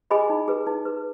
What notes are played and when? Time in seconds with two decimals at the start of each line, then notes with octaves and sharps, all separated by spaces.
0.11 G#4 D#5 G#5 B5
0.30 D#4
0.48 G#4 B4
0.67 D#4
0.85 G#4 B4